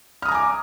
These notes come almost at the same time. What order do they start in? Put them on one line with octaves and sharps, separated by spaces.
F6 D#6 A#5 G#5 D6